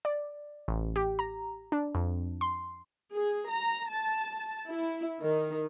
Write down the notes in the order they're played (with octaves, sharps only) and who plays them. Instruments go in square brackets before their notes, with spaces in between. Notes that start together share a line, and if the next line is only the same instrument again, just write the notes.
[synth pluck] D5
A1
G4
A#5
D4
F2
C6
[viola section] G#4
A#5
A5
E4
D#3